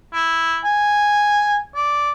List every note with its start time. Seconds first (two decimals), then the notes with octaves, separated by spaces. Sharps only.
0.14 E4
0.65 G#5
1.75 D5